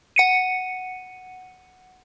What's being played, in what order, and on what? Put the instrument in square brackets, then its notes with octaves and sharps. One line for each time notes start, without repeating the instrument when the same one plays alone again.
[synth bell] F#5 C#7 D#7